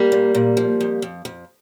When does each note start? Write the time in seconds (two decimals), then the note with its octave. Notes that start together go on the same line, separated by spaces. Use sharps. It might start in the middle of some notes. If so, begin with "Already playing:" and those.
Already playing: G3 A#3
0.12 A#2
0.35 A#2
0.57 F3
0.81 F2
1.02 F2
1.25 F2